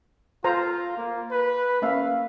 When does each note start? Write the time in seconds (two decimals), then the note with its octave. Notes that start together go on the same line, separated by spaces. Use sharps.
0.44 F4 A4 C5 A#5
0.97 A#3
1.31 B4
1.82 A#3 C#4 E5 F5